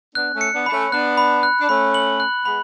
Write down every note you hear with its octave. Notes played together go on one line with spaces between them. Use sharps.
B3 D4 F#6
A3 C#4
C#7
B3 D4
D4 B5
A3 C#4
B3 D4 F#6
B5
F#6
D4
A3 C#4 B5
F#7
F#6
G#3 B3 B5